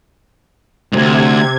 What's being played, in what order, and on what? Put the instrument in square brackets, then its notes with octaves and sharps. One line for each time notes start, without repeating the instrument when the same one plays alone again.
[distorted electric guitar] D2 G#2 [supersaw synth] C3 G#6